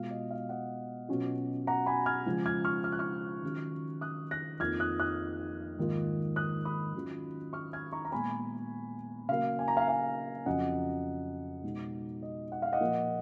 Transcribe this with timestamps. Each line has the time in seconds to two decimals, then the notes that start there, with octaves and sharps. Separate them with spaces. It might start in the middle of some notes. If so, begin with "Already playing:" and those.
Already playing: B2 G#3 B3 F4 F5
0.11 D#5
0.31 F5
0.49 D#5 F#5
1.09 B2 F#3 C#4 F4
1.67 F#5 A#5
1.86 G#5 B5
2.06 F6 G#6
2.26 C#3 F3 G#3
2.46 F6 G#6
2.65 C#6 F6
2.84 F6
2.92 F#6
2.99 C#6 F6
3.43 D#3 F#3 C#4 F4
4.01 D#6 F#6
4.31 F#6 A#6
4.60 F2 F3 A#3 D#4 F6 G#6
4.80 D#6 F#6
5.00 D#6 F#6
5.78 G#2 D#3 A#3 F4
6.36 D#6 F#6
6.65 B5 D#6
6.94 D#3 F#3 C#4 F4
7.53 C#6 F6
7.73 F6 G#6
7.93 A#5 C#6
8.05 A#5
8.11 A#2 G#3 B3 G#5 B5
9.29 C#3 F#3 A#3 F5
9.59 G#5
9.68 A#5
9.77 F5 G#5
9.88 F5 G#5
10.46 F2 C#3 F#3 C#4 D#5 F#5
11.63 B2 G#3 D#4
12.22 D#5
12.52 F#5
12.62 F5
12.73 D#5 F#5
12.81 A#2 F3 A#3 F4